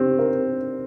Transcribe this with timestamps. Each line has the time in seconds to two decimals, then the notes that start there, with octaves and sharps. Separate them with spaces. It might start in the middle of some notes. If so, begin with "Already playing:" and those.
Already playing: C4 G4
0.19 A#4